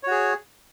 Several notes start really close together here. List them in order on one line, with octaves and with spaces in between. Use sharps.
C#5 F#4 G#4